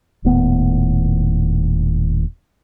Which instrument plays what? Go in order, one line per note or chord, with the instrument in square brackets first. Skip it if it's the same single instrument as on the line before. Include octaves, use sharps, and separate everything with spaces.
[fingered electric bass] D#1 D#2 A2 B3